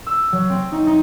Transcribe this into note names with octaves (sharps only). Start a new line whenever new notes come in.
E6
F#3
C4
D#4
D#4